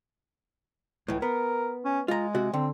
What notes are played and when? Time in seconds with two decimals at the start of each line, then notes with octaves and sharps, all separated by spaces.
1.08 C#2 A2 E3
1.22 B3 A#4
1.85 C#4
2.08 G#3 F4 A#5
2.35 C3 F#4
2.53 D3 C4